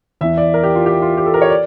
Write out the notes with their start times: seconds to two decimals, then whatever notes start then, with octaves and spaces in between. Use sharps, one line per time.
0.21 E2 E3 E5
0.37 D5
0.54 A#4
0.64 G4
0.75 F4
0.86 G4
1.02 F4
1.17 G4
1.26 A4
1.34 A#4
1.42 C#5
1.50 D5